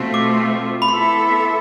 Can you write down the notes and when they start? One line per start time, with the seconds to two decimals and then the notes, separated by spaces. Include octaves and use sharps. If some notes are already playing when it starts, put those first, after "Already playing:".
Already playing: B2 A3 C4 F4
0.14 D6
0.82 B5
0.88 B3 E4 A4 E5 C6